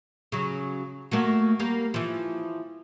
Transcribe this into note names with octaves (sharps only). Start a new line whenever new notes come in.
C#3 F#3
F#3 A3 A#3
G3 A#3
E3 F3